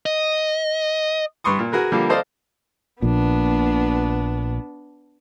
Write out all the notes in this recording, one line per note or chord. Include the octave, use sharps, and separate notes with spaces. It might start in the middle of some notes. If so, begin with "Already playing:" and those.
D#5
G2 B4 C6 C#6 D#6
A#2
F#4 G#4 A#4 B4
D3 F3 G3 A#3
A4 C5 D5 D#5 F5
A#1 A#2 B3 D4